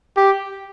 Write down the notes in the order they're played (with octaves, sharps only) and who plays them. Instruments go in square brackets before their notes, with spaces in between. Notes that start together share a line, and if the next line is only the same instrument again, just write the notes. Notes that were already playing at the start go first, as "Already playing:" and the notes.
[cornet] G4